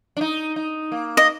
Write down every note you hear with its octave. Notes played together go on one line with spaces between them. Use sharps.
D4
D#4
D#4
A#3
D#5